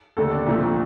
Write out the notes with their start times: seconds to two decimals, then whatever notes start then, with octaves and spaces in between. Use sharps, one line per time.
0.17 D#2 D3 A3 A4
0.31 D4
0.46 C2 A#2 F3 A3